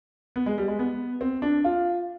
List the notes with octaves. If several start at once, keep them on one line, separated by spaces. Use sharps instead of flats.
B3
G#3
G3
G#3
B3
C4
D4
F4